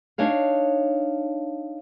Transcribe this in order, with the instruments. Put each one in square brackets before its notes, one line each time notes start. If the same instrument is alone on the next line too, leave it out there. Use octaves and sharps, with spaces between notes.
[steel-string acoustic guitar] D4 D#4 C#5 F5